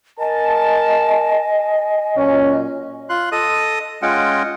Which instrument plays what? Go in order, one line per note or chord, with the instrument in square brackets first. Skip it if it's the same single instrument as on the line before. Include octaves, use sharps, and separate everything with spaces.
[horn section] A#4 A5 [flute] D#5 [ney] G#5
[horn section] A#2 F#3 [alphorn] C#4
[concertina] F4 C6 F#6
A4 D#5 D#6
G#3 C#4 F4 D#5 F#5 G5